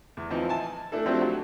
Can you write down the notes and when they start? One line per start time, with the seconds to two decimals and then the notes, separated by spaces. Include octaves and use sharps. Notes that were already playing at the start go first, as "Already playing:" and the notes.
0.17 E2
0.30 E3 F3 C4 D#4
0.49 G#5 A5
0.92 A3 D4 E4 A4
1.06 F3 F#3 A3 C4 D4 G4
1.21 F#3